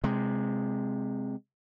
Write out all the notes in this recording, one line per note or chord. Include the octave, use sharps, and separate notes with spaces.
C3 G#3